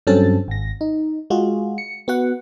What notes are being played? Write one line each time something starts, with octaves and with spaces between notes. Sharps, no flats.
G2 F#3 C4 C#4 A4 A6
G#1 A#6
D#4
G#3 F4 F#4 G#4
C#7
B3 F#4 F#5